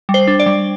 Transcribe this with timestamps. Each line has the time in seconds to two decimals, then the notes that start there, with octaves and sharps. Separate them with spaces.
0.09 G3
0.14 C5
0.27 D4
0.40 D5
0.46 G3